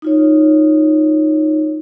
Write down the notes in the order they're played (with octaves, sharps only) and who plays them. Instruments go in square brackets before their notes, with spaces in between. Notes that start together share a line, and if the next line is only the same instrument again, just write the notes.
[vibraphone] D#4 F4 C#5